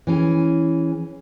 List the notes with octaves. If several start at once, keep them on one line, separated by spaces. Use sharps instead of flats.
E3 C#4 G#4